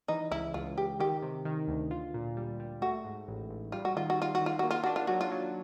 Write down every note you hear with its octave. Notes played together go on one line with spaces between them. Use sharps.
E3 D#4
C#2 E4
C#2 F4
C#2 G4
D#3 G4
C3
D#3
D2
F4
A#2
G3
G3
A3 F#4
G#2
A1
A1
G3 F4
F#4
D#3 F4
F#4
G3 F4
F#4
D#3
F4
A#3 F#4
F4
D4 F#4
F4
F#3 F#4
F4
F#3